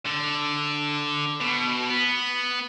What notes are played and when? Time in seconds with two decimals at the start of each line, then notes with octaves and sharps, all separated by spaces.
0.06 D3
1.41 B2
1.90 B3